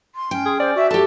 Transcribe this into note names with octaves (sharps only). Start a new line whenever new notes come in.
C6
C#4 G5
G#4
C5 D5
F#4 E5
G4 A4 A5